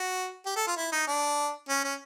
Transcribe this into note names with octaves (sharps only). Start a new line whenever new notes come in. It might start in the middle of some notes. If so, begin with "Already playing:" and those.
Already playing: F#4
G4
A4
F4
E4
D#4
D4
C#4
C#4